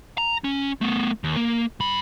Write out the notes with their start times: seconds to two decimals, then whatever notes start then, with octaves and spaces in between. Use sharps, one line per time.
0.18 A#5
0.44 C#4
0.81 A3 B3
1.24 D#2
1.37 A#3
1.80 G2 B5